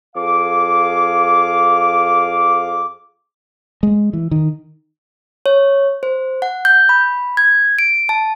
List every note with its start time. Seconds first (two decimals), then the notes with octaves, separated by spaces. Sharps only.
0.16 F2 G#4 F5 D6
3.83 G#3
4.13 E3
4.31 D#3
5.46 C#5
6.03 C5
6.42 F#5
6.65 G6
6.89 B5
7.37 G#6
7.79 D7
8.09 A5